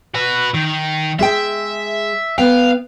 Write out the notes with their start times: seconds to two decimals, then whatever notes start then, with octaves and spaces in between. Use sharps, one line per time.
0.14 F#4 B4
0.54 D#3
1.19 G#3 G#4 E5 G5
2.38 B3 F5 G5